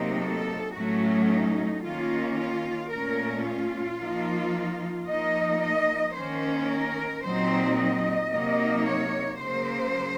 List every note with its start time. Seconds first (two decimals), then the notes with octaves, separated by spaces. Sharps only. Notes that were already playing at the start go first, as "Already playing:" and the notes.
Already playing: C3 F#3 A#3 D#4
0.22 A4
0.75 A2 F#3 A3 C#4 F#4
1.29 D#4
1.83 D#3 A#3 C#4 F4
2.38 F4
2.92 A#2 A3 C#4 A#4
3.46 F4
3.99 F3 A#3 D#4
5.07 F3 A#3 D#4 D#5
5.62 D#5
6.15 D#3 A#3 C#4 C5
6.69 A#4
7.23 A#2 F#3 C4 D#4 C5
7.77 D#5
8.31 C3 F#3 A#3 D#4
8.86 C#5
9.39 C#3 F#3 A#3 C5